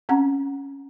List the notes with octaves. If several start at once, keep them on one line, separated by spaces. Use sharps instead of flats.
C4 C#4 F#5 A#5